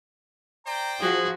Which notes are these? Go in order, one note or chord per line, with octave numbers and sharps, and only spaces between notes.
C5 D5 G5 A#5
F3 F#4 G#4